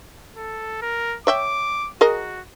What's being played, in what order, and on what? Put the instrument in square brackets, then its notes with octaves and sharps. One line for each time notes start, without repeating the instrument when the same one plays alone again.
[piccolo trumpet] A4
A#4
[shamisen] C#5 E5 G5 [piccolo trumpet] D6
[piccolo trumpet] F#4 [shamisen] G#4 A#4 D#5